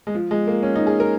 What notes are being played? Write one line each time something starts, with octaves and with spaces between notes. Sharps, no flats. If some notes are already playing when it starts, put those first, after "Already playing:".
G#3
F3
G#3
A#3
C#4
D#4
G#4
A#4